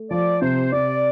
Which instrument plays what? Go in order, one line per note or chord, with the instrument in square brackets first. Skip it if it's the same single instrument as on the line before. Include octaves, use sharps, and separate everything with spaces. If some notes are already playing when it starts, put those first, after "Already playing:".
Already playing: [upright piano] A3
[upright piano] F3 [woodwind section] D5
[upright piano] C3 [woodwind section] C5
[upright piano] C3 [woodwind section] D5